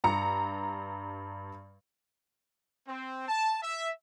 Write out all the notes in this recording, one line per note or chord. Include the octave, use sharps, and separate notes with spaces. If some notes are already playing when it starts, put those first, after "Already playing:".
G2 A#5 C#7
C4
A5
E5